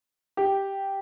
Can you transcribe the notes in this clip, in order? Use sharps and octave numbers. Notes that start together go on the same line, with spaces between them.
G4